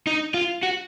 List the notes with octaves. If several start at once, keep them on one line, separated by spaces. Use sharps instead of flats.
D#4
F4
F#4